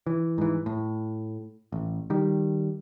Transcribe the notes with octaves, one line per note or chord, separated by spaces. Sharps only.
E3
G#2 E3
A2
A1
D#3 G3